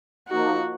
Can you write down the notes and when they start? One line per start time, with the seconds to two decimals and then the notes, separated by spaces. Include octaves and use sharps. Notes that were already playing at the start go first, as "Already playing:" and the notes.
0.29 F3 A#3 D#4 F#4